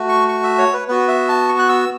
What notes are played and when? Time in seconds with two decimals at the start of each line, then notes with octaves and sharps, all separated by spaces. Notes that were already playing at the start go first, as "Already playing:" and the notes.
Already playing: A3 F#4
0.09 C#6
0.28 C#6
0.43 E5
0.58 C#5
0.73 B4
0.88 B3 F#4 B4
1.08 E5
1.29 A5
1.49 C#6
1.59 F#6
1.69 E6